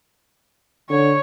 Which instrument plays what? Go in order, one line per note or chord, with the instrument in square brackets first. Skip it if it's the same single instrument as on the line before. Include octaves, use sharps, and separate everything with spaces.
[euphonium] D3 [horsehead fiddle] C#5